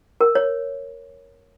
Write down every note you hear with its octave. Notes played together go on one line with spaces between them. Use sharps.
A#4
C#5